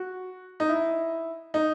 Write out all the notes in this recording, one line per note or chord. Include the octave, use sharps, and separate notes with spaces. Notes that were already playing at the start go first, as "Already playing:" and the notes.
Already playing: F#4
D#4
E4
D#4